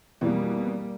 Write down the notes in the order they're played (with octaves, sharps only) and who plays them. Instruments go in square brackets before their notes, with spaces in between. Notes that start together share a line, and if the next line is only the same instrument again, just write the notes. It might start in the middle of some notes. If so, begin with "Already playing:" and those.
[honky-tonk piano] F2 B2 E3 [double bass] G3 A#3